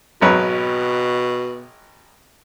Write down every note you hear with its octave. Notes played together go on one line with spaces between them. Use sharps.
G#1 B2 F#3 B4